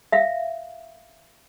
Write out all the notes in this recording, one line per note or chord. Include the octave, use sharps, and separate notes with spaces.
E5 F5